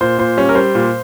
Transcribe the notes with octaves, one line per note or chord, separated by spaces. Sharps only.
A#2 C5
A#2 C5
G3 C#4
A#4
G3 C5
A#2